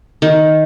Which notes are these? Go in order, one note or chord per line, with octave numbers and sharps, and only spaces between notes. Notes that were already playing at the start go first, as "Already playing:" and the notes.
D#3